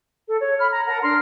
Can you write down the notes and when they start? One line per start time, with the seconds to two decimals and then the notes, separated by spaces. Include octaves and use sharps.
0.27 A4
0.40 C#5
0.59 B5 F6
0.71 A#5
0.87 A#4 F#5 A5 A#5
1.02 D4 A#4 C6 F6